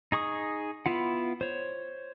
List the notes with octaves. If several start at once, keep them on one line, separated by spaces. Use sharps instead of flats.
D#4 G#4 C#6 D#6
B3 E4 F4 F#5
C5 C#5